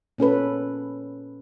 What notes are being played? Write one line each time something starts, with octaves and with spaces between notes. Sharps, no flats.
A#2 C#4 A4 B4